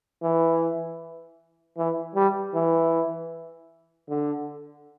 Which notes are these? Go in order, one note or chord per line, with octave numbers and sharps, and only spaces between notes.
E3
E3
G3
E3
D3